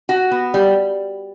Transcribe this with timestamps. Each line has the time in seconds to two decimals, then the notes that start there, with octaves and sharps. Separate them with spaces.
0.09 F#4
0.31 B3
0.54 G3